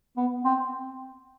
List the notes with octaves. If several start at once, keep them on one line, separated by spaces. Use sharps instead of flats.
B3
C4